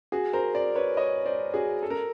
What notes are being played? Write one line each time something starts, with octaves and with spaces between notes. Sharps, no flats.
F#4 G#4
A#4 C5
C5 D5
B4 C#5
C#5 D#5
C5 D5
F#4 G#4
A4
A#4